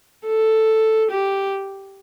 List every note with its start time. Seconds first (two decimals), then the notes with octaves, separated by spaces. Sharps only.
0.26 A4
1.11 G4